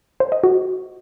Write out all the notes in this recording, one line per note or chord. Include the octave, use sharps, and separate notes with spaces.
C5
D#5
F#4